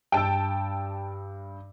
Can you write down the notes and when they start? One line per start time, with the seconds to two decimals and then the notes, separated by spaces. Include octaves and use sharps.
0.12 G2 G5 A5 E6